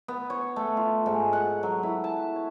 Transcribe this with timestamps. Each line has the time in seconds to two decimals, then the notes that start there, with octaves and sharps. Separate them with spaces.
0.08 B3
0.30 C#5
0.56 A3
0.77 F4
1.06 G#2
1.33 F#5
1.63 F#3
1.83 E4
2.04 A5
2.36 C#5